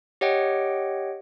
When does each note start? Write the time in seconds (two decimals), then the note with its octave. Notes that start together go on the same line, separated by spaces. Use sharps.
0.21 G4 C#5 D#5 F#5 G5